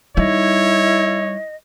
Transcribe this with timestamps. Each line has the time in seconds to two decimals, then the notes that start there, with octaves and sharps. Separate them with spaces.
0.17 G3 D#4 E4 C#5 D#5